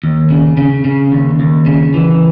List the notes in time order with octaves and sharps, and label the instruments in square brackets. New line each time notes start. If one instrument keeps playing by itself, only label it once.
[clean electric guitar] D#2
C#3
C#3
C#3
D#2
D#2
C#3
E3